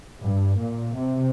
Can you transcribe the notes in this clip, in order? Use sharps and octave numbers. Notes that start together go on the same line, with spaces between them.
G2
A#2
C3